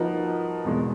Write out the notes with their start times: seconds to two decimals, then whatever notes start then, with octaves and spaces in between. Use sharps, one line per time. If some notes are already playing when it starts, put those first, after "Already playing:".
Already playing: F3 A#3 D#4 F#4 B4
0.65 E2 B2 G#3